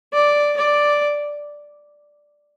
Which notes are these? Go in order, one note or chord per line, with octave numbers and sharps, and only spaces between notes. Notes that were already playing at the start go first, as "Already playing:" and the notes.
D5
D5